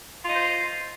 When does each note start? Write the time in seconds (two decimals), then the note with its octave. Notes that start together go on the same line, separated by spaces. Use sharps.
0.24 F4
0.29 D#5
0.34 C5